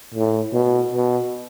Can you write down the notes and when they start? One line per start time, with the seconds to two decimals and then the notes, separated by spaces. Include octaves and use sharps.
0.14 A2
0.53 B2
0.92 B2